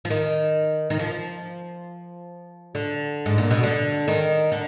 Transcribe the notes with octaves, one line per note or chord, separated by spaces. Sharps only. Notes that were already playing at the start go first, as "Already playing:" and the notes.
F3
D#3
D#3
F3
D3
G#2
A#2
B2
D3
D#3
D3